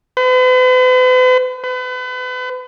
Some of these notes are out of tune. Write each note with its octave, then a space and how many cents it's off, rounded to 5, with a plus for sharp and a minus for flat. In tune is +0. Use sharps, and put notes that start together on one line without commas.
B4 +45
B4 +35